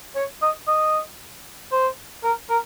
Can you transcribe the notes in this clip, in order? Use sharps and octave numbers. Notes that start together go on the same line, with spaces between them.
C#5
D#5
D#5
C5
A#4
A#4